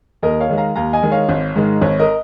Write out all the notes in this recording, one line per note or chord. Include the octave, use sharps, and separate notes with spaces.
D#2 A#4 D#5
C#5 F5
D#3 G#3
F5 A#5
D#2 F5 A#5
D#5 G#5
D#3 G#3
C#5 F5
G#1
G#2 D#3 G#3
G#1 C#5
A#4 D#5